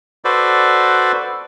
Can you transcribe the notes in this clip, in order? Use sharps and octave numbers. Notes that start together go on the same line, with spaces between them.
F#4 A4 B4 C5 D5